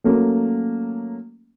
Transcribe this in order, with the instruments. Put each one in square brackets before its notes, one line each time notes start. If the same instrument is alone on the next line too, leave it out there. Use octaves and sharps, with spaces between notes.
[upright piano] F#3 A3 A#3 C#4